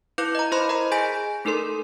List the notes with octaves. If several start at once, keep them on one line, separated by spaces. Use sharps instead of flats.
E4 B4 F5 D6 G6 C#7
D#5 A#5
E4 C5 D#5 B5 C6
A#4 D#5 A#5 C6
G#4 G#5 G6 A#6 B6 D7
A3 D#4 A4 A#4 C6